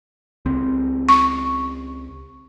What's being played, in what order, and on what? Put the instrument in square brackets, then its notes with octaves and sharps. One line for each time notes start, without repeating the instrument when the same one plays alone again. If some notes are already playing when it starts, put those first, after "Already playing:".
[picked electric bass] C#2 C4
[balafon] C#6